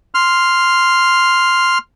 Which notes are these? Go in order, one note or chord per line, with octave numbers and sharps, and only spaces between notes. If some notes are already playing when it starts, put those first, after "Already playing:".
C6 F6